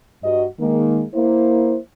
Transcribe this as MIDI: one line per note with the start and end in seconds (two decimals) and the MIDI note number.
0.24 0.46 43
0.24 0.46 66
0.24 0.46 75
0.59 1.03 51
0.59 1.03 56
0.59 1.03 58
1.14 1.78 58
1.14 1.78 64
1.14 1.78 72